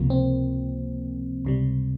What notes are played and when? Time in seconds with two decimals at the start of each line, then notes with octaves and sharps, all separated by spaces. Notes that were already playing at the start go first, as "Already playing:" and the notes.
Already playing: C#2 C3 F3 A#3
0.10 C4
1.45 C#2 C3 G3